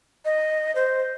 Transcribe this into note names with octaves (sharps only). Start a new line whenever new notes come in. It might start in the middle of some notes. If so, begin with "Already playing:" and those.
D#5
C5